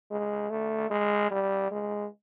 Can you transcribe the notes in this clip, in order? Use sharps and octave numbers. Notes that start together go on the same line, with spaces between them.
G#3
A3
G#3
G3
G#3